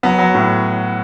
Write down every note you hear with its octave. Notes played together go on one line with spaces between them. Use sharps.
F#3 B3
F#3
A2